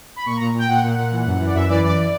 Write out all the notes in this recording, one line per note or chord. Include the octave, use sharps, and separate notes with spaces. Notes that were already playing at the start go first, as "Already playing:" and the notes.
B5
A#2 C#6
A#2 A#5
A#2 G5
A#2 F#5
A#2
A#2
E3
F#2
E3
D5
F#2 E5
E3 D5
F#2 D5